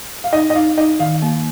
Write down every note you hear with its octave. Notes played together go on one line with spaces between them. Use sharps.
F5
D#4 D#5
D#5
D#4 F5
D#4 D#5
D#3 F5
A#3